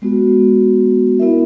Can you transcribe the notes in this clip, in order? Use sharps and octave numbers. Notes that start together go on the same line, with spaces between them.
G#3 B3 F#4
B3 E4 A#4 E5